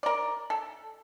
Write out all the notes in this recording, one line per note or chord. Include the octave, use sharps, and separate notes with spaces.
A#4 D5
A4